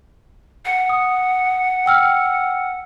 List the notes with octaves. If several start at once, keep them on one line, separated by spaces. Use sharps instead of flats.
F#5
D#6
G5 E6 F6